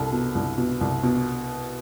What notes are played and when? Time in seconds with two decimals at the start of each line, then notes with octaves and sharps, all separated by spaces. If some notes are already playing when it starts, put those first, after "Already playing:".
Already playing: C2 A4
0.12 B2
0.35 C2
0.58 B2
0.81 C2
1.03 B2